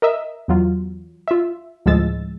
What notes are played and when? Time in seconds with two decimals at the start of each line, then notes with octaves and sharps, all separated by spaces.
0.02 A#4 D#5 E5
0.48 E2 F#3 F4
1.28 F4 E5
1.86 D2 A2 F3 G#3 E6 A6